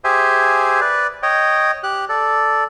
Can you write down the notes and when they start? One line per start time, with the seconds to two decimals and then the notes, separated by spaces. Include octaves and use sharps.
0.04 G4 G#4 C5 E5 G#5
0.81 B4 D5
1.23 C#5 D#5 G5
1.83 G4 F#6
2.09 A4 D5